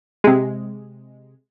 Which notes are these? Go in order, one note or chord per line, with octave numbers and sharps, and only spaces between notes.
C3 G#3